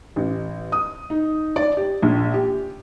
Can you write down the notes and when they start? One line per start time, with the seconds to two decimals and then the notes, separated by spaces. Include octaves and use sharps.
0.16 A1
0.72 D#6
1.10 D#4
1.56 D5
1.77 G4
2.02 A#1
2.34 G4